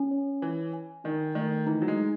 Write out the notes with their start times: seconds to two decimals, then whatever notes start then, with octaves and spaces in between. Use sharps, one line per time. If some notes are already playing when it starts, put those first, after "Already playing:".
Already playing: C#4
0.11 C#5
0.42 E3 G#5
0.73 G#5
1.04 D#3 D#4
1.35 D#3 A3
1.67 E3 D#4
1.82 F#3
1.88 G#3
1.98 D#4